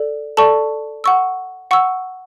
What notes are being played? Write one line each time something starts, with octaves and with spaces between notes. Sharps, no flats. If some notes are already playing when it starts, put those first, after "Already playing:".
Already playing: A4 D5
A4 D5 A5 C#6
F#5 C#6 E6
F#5 C#6 E6